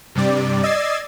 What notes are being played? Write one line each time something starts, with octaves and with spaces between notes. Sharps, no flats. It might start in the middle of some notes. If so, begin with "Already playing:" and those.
G2 C3 G3 D5
D5 D#5 E6 G#6 A6 C7